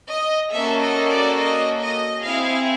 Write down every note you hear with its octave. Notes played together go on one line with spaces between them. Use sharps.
D#5
A#3 C#4 F#4 A4 E5
D#5
D5
D#5
D#5
C4 E4 G#4 F5